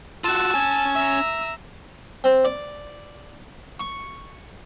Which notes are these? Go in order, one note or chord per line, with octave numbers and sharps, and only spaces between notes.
F4 F#4 A5 E6
C#4 G#5
E5 A#5 E6
C4
D5
C#6